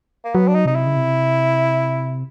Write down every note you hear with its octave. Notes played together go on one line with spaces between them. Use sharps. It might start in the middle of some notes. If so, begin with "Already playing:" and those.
A#3
F#3 B3
D4
D#4
C3 D#4
E4
C#3
C3